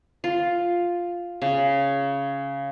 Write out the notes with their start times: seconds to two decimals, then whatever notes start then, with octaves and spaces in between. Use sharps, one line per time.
0.24 F4
1.42 C#3